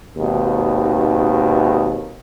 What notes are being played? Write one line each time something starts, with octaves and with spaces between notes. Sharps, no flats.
G#1 D#2 B2